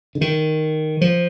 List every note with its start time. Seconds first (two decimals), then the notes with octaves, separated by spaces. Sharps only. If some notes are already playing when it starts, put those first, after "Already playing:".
0.15 D3
0.21 D#3
1.01 F3